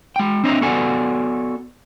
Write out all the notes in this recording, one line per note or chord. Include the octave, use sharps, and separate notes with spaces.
G#3 G5
C4 D4 D#5 E5 A#5
B3 F#4 A4 D5 G#5